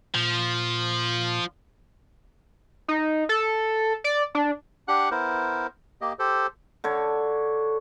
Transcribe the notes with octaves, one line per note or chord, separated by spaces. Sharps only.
A#2 F3
D#4
A4
D5
D4
D4 G4 F#5 F#6
B3 E4 A#4 C5
A#3 G4 D#5
G4 A4 C5
D3 A4 C#5